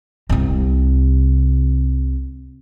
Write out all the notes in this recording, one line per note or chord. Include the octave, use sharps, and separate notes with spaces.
C2 C3